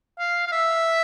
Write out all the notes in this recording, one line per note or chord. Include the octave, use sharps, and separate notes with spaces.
F5
F5
E5